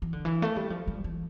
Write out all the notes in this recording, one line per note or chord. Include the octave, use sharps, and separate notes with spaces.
E3
D3
E3
A3
G3
F3
G3
E3